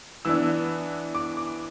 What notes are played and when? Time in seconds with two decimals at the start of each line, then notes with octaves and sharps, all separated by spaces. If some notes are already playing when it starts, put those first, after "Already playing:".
0.25 E3 B3 D4 E6
1.15 D6
1.37 D6